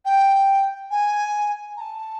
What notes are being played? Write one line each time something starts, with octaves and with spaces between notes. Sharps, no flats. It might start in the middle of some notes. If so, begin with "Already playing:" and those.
G5
G#5
A#5
A5